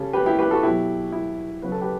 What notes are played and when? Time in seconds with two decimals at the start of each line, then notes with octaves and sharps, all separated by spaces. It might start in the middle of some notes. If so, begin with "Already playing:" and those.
Already playing: C#3 G3 A4
0.13 G4 B4
0.26 E4 G4
0.39 G4 B4
0.51 F#4 A4
0.63 B2 F#3 E4 G4
1.12 E4
1.62 C#3 F#3 B4
1.72 A4
1.81 G4 B4